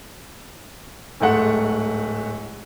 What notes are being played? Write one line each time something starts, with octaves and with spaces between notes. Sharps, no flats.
D1 G#2 A3 F#5